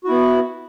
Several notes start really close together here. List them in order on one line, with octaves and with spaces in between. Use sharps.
F#4 E4 B3